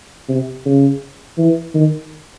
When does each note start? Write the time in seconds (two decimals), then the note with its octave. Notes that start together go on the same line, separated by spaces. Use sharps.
0.29 C3
0.66 C#3
1.38 E3
1.74 D#3